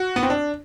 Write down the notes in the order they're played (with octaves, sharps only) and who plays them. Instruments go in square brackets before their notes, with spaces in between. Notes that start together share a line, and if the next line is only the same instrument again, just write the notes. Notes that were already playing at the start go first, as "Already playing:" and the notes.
Already playing: [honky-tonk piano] F#4
B3
C4
D4